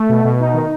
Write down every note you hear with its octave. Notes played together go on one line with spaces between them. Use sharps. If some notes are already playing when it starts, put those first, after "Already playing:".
Already playing: A3
B2
B2
D#4
D#3